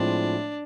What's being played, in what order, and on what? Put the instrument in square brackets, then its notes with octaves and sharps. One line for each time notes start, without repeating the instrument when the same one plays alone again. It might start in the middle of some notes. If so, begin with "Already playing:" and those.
Already playing: [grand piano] A2 F3 G#3 C4 [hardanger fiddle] D4